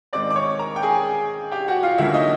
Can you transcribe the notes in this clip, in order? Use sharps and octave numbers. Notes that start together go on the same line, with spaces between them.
G#2 D#3 G#3 C4 D5 D6
D6
C#5 C#6
A#4 A#5
G5
G#4 G#5
G4 G5
F#4 F#5
F4 F5
D2 C#3 F#3 A#3 C#4 E4 E5
D#4 D#5